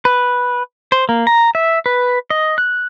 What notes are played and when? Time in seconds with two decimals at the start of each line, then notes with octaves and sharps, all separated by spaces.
0.05 B4
0.92 C5
1.09 A#3
1.27 A#5
1.55 E5
1.86 B4
2.30 D#5
2.58 F#6